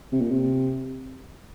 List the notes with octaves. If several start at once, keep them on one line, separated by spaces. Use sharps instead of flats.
C3
A#2
C3